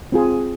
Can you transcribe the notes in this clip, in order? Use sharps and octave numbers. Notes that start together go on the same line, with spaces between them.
C4 F4 G#4